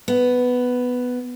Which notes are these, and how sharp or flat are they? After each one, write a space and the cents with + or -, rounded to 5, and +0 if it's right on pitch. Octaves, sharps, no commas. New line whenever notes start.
B3 +5